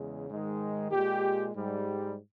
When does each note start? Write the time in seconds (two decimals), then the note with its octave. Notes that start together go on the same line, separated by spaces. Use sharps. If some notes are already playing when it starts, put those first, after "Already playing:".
Already playing: E2 C#3 G#3
0.30 G#2 D#3 G#3
0.91 A#2 G#3 G4
1.54 G#2 G3